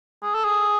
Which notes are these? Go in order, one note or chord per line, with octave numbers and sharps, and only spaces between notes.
G#4
A4
G#4